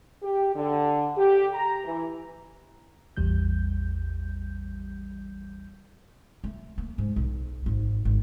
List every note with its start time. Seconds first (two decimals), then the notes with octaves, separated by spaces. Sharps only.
0.23 G4
0.55 D3
1.17 G4
1.53 A#5
1.85 E3
3.17 A1 E2 G3 G6
6.44 A3
6.78 A#3
6.98 G#2
7.16 B1
7.66 G#1
8.05 G#1